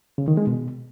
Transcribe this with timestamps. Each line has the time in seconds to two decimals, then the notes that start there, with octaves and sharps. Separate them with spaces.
0.18 C#3
0.28 D#3
0.37 G#3
0.47 B2